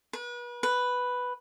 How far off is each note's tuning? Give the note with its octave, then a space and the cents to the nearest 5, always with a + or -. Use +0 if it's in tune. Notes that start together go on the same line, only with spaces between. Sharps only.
B4 -35
B4 +0